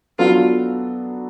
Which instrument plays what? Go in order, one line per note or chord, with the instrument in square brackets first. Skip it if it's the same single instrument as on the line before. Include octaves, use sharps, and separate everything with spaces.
[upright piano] F#3 B3 D4 F#4 A4 [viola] F4